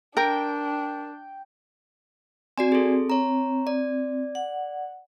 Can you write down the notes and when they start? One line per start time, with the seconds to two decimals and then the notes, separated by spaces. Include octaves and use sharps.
0.17 D4 A#4 G5
2.58 C4 F#4 D5 G#5
2.72 G#4 A4
3.10 C#5 A#5
3.67 D5
4.35 F#5